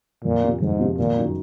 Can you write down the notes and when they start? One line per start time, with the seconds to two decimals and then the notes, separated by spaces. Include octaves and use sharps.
0.24 F2 A#2
0.43 C3 F3
0.61 F2 G#2
0.79 C3 F3
0.98 G#1 A#2
1.16 F#2 D#3